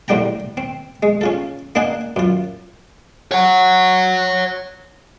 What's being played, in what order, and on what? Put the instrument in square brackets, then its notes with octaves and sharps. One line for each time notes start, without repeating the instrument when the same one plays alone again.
[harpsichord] A2 D3 G3 G5 A#5
C4
G#3
C#4 F4 A4
A#3 D4 D#4 F#5 G#5
F#2 F4
[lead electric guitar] C#5 F#5